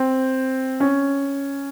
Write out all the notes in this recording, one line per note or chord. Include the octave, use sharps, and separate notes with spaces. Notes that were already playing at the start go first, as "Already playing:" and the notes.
Already playing: C4
C#4